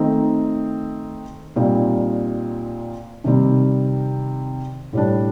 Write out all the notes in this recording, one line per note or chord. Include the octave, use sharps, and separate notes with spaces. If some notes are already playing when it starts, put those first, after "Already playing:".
Already playing: D#3 A3 C4 D#4
A#2 G3 C4 D#4
C3 D#3 G3 C4
A2 G3 D4